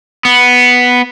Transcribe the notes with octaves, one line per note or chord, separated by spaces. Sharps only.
B3